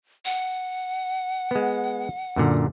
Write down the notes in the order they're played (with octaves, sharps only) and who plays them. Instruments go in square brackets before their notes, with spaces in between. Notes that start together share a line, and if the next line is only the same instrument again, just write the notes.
[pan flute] F#5
[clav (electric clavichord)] G#3 B3
F#2 A#2 D3